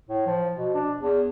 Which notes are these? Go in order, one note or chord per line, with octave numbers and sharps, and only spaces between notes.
A2
F3
B2
D4
E2